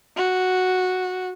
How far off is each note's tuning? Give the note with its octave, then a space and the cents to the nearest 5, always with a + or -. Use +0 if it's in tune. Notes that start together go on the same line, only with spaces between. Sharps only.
F#4 -5